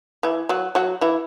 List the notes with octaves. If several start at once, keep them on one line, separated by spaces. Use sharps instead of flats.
E3 E4
F#3 F#4
F#3 F#4
E3 E4